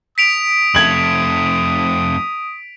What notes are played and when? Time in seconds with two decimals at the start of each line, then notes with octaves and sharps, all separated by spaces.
0.18 D#6 B6 D7 F7
0.75 F2 A3 G#6 F#7